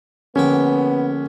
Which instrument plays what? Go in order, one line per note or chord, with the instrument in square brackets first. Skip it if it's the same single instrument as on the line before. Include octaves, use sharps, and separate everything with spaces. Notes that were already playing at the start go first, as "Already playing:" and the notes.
[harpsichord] A#1 D3 G5 [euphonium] B3 [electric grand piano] C#4